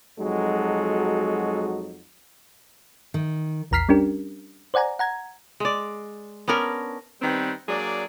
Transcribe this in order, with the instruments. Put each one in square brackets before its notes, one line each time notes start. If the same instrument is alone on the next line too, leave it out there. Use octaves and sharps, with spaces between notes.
[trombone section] F2 F#3 G#3 D#4 F#4 A4
[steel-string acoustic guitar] D#3
[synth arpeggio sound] A#1 E2 A#5 F6 B6 C7
G3 C#4 D4 G4 A#4
C5 D5 F#5 G#5 A#5
F#5 A#5 G#6
[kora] G#3 D5
B3 C#4 D4 A#4
[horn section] D#3 G3 B3 C4 B4
F#3 A#3 D4 G#4 D5